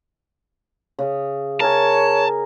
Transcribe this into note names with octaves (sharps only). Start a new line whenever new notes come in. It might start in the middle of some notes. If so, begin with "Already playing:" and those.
C#3
A#4 C#5 G#5 A5